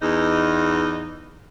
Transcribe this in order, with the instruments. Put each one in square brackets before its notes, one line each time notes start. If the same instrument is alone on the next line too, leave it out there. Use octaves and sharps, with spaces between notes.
[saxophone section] E2 D#4